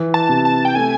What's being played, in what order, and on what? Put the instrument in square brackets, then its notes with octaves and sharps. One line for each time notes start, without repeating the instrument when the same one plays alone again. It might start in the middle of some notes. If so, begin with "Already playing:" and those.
Already playing: [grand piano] E3
[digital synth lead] A5
[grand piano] C3
[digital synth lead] A5
G5
[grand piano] A3 [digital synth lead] G#5